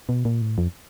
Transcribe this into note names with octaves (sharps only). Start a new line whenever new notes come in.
B2
A#2
A2
F2